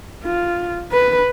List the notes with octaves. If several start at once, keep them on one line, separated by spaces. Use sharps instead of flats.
F4
B4